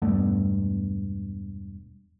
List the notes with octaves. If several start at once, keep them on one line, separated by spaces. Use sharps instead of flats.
E1 G2 A3 B3